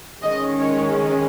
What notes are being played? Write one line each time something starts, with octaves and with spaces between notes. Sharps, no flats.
D#3 G#3 C#4 D#5
C#5